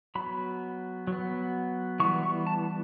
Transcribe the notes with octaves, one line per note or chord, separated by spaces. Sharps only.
F#3 B3 B5
F#3 B3
E3 G3 B3 C#6
C#6
A5